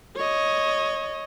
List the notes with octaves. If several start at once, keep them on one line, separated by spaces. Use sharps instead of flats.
C#5 D#5